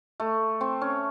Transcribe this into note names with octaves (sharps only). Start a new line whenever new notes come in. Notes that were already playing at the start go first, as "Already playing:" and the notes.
A3
C4
C#4